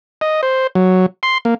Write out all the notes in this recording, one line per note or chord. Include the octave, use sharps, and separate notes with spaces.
D#5
C5
F#3
C6
A#3